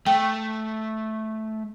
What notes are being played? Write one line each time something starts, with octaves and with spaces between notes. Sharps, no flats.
A3 G5